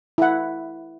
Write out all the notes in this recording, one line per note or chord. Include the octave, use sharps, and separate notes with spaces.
E4 F#5